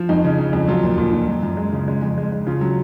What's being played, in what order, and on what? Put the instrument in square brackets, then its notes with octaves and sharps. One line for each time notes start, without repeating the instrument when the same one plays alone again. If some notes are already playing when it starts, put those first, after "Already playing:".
Already playing: [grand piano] F3
F2 D#4
C#3
C#3
F2
F#3 F4
A#2
A#2
A#2
F#2
F#2
G#3
C#3
G#3
F2
G#3
G#3
C#3 F4
F#3